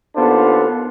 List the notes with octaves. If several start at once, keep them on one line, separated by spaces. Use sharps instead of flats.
D#2 B3 D4 F4 A4 C5